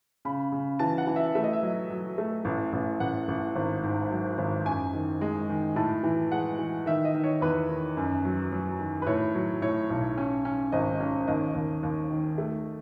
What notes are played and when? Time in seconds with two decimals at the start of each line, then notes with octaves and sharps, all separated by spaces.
0.25 C#3 B5
0.52 C#3
0.79 E3 A5
0.98 F#5
1.07 E3
1.16 E5
1.35 A3 E5
1.44 D#5
1.53 E5
1.63 F#3
1.90 F#3
2.18 A3
2.45 A1
2.73 A1
3.00 A1 F#5
3.28 A1
3.56 G#1
3.83 G#2
4.11 F#3
4.38 G#1
4.65 F#2 G#5
4.93 D#3
5.21 G#3
5.49 D#3
5.76 A2 A5
6.03 E3
6.32 G#3 F#5
6.59 E3
6.86 D#3 E5
7.05 D#5
7.14 D#3
7.24 C#5
7.41 E2 B4
7.69 D#3
7.97 F#2
8.25 F#3
8.52 F#3
8.79 D#3
9.02 B4
9.07 A2 C#5
9.34 F#3
9.62 A2 C#5
9.90 B1
10.18 C#4
10.45 C#4
10.72 G#1 D#5
11.00 C#4
11.27 D#2 D#5
11.55 D#2
11.83 D#2
12.10 D#3
12.38 A3